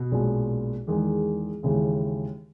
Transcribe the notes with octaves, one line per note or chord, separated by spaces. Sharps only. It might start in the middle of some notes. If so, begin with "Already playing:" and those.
Already playing: B2
B1 A#2 G#3 C#4
E2 D#3 G#3
D#2 C#3 E3 G#3